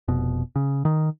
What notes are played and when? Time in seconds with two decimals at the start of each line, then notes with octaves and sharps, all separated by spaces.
0.08 F1 B2
0.56 C#3
0.85 D#3